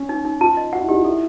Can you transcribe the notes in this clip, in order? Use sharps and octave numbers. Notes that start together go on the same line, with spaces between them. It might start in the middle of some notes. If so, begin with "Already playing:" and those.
Already playing: C#4
D#4
D#4
F4 A5
D#5
F#4 F#5
E4
D#4 G4
F4
E4 A4